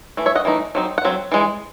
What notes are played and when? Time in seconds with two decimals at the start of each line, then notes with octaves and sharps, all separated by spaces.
0.17 E3 A3
0.26 C#5 E5
0.35 D#5 F#5
0.45 E3 A3 D#4
0.75 F#3 C4 D#4
0.98 F#5
1.05 F#3 C4
1.32 E3 G#3